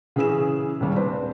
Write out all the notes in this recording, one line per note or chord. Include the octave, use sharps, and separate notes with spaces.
C#3 E3 C#4 G#4 E6 E7
D#2 C#3 G3
C4 D4 B4 C5